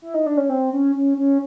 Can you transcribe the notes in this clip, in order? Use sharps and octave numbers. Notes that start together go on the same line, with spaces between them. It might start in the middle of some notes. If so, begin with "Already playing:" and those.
E4
D#4
D4
C#4
C4
C#4
C#4
C#4